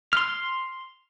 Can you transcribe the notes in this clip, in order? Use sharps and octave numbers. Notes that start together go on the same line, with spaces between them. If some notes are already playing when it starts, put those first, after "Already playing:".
C6 F6